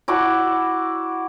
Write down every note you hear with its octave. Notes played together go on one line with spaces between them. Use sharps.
E4 F#4 D5 A5